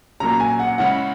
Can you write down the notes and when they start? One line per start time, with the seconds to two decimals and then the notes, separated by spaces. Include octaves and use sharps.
0.20 A#2 F#3 A#3 C#4 A#5
0.40 G#5
0.59 F#5
0.78 C#3 G#3 C#4 E4 F#5